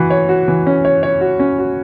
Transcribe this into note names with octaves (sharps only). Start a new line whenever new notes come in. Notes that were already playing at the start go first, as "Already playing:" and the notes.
Already playing: E3 F#4
C#5
F#4
E3
C#4
C#5
C#5
F#4
C#4
F#4